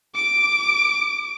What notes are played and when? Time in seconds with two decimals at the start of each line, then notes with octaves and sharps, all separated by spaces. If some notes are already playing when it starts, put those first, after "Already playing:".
0.15 D6 D7